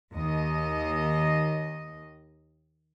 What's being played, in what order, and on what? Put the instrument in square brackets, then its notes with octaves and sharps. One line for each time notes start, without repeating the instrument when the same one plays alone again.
[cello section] D#2 D#5